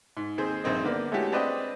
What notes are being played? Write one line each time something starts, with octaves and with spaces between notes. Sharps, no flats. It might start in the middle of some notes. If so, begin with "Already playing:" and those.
G#2
D#2 C4 G#4 C5
A#1 G2 D#3 C4 C5 D#5
D3 A#3 B3 D5
G#3 A3 C#4 E4 F#4 G4
C4 D4 B4 D5 D#5 G5